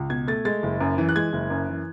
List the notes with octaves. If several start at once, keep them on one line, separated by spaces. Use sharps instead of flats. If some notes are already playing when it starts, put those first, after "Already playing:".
Already playing: C#2
B2 G#6
A3 A6
G#3 A6
F#1
F#2
E3
F#6
G#3 G#6
F#1
F#2
E3